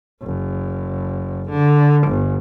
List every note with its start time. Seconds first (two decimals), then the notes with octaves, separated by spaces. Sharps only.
0.22 F#1
1.50 D3
2.08 G1